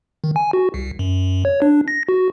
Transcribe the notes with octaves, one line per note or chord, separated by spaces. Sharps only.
D#3
G#5
F#4
C2
F#2
C#5
D4
A#6
F#4